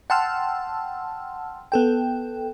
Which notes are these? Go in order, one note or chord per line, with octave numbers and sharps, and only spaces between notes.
F#5 G5 A5 C6 E6 F6
B3 A4 G5